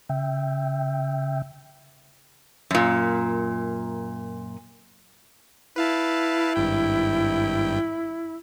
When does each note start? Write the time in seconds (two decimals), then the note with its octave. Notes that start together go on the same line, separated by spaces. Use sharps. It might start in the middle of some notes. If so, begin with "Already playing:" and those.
0.09 C#3 E5 G5
2.71 F#2 A#2
5.76 E4 B4 F5 A5
6.56 G#1 G2 G5